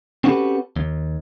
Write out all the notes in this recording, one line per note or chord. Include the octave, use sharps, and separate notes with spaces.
C4 C#4 F#4 G4 A4 B4
D#2